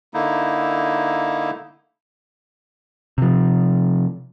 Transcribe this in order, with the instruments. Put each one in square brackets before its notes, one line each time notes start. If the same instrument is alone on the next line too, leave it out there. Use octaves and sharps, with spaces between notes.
[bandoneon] D3 A#3 D#4 E4
[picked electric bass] C3 F3